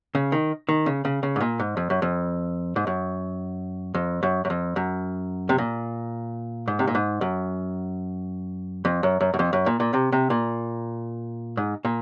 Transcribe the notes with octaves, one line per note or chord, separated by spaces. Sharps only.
C#3
D#3
D#3
C#3
C#3
C#3
G#2
A#2
G#2
F2
F#2
F2
G#2
F#2
F2
F#2
F#2
F2
F#2
C3
A#2
G#2
C3
A#2
G#2
F#2
F2
F#2
F#2
F#2
F2
F#2
A#2
A#2
C3
C3
A#2
G#2
A#2